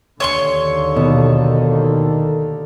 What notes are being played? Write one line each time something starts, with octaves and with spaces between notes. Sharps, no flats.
D#2 D3 C#5 C6 C#6
B2 D#3 A4